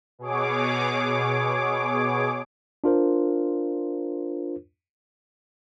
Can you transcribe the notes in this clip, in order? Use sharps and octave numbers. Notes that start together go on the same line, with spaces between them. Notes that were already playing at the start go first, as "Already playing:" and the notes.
B2 G#4 C#5 D6
D4 F4 A#4 C5